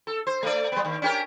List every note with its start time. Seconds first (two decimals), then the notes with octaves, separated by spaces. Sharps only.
0.07 A4
0.27 C5
0.43 A3 D5
0.72 G3 B3
0.85 D#2
1.02 C#4 G4 A#4